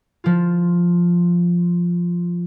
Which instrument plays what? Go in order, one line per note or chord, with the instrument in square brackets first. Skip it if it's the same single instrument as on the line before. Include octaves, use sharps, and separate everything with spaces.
[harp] F3 F4